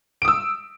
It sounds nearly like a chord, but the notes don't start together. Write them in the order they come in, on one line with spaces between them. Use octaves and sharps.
D7 D#6 E6